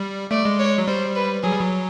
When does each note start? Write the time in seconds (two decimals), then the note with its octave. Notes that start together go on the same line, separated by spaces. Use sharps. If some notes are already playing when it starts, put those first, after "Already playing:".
Already playing: G3
0.31 A3 D5
0.45 G#3
0.59 C#5
0.78 F#3
0.88 G3 C5
1.15 B4
1.43 F#3 G#4
1.51 G3
1.61 F#3